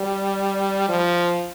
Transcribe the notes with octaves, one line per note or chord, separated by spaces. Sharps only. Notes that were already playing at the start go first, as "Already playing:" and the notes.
Already playing: G3
F3